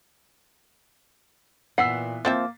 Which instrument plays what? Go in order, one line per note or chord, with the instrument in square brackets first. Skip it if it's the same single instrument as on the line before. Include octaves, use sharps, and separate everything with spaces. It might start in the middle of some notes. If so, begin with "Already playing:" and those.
[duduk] A#2 [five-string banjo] E3 B3 F#5 [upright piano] E6 B6 C7
[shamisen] F3 C4 E5 [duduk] A#3 [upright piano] A6